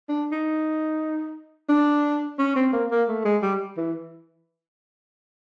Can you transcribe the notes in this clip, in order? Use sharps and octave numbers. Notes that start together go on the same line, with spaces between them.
D4
D#4
D4
C#4
C4
A#3
A#3
A3
G#3
G3
E3